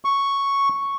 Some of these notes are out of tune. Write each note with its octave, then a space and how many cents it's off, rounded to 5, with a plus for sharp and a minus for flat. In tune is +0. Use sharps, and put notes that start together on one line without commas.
C#6 +0